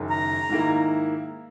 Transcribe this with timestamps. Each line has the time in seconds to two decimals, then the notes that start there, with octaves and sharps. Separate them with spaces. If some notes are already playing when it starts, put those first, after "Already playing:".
Already playing: F#1 F#2 D#3
0.10 A#5
0.49 G#2 D#3 A#3 E4